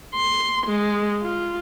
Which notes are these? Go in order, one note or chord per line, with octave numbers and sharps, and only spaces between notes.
C6
G#3
F4